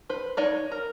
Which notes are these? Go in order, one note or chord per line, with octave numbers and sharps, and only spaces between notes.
B4 C5
D#4 C#5 D5
A#4